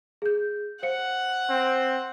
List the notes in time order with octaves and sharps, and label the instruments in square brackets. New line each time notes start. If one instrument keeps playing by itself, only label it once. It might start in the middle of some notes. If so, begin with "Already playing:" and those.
[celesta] G#4 G6
[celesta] C5 F5 C#7 [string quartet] F#5
[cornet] C4